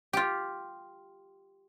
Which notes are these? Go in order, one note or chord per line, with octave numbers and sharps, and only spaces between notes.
F4 G4